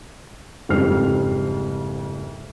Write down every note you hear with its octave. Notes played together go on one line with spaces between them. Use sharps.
F#1 F2 G#2 G3 F6 C7